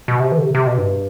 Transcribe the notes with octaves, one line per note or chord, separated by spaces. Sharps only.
B2
C3
E3
D3
C3
C3
B2
G2